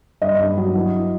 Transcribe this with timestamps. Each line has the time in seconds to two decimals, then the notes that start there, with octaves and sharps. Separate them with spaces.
0.22 G2 D#5
0.39 G2
0.57 F#3
0.75 E3
0.93 E3